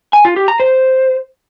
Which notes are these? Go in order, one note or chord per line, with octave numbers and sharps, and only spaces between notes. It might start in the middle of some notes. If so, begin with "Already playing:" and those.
G#5
F4
G4
A#5
C5